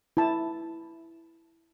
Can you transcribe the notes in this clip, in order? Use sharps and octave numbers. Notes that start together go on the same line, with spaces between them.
E4 A5